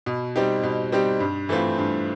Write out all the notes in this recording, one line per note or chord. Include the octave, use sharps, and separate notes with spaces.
B2
G3 C4 D#4 G4
B2
G3 C4 D#4 G4
G2
E3 A3 C4 F4
G2